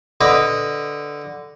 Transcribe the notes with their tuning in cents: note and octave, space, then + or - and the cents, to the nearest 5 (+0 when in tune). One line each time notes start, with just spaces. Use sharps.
D3 +0 B4 +0 D#5 +0